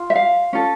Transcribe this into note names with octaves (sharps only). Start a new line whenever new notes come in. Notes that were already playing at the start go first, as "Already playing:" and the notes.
Already playing: F4
E5
F5
C#4 F4 A4